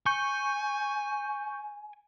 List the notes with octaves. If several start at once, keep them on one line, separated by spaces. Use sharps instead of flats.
G#5 C#6 G6